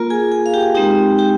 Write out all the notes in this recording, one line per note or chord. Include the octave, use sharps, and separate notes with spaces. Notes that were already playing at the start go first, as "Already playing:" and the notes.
Already playing: A#3 F4 A#4 A#5
G#4 G#5
G#4 G#5
F5
G4 G5
G#3 C4 D#4 G4 G5
G4 G5